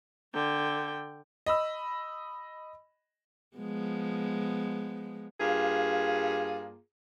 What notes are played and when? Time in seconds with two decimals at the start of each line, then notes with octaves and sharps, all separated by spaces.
0.33 D3 G5
1.46 D#5 B5 E6
3.57 F3 G#3 B3
5.41 G2 A#3 F4 G#4